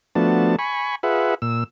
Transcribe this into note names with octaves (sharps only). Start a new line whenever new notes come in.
F3 A3 B3 D4 F#4 A5
G#5 B5 C#6
F4 G#4 B4 E5 F#5
A#2 E6